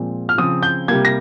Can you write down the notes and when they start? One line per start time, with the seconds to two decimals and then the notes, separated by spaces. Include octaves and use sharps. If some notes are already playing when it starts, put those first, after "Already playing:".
Already playing: A#2 F3 G#3 C4
0.29 F6
0.38 C#3 F3 C4 D#6
0.63 G6
0.88 C3 G3 A#3 G#6
1.05 A#6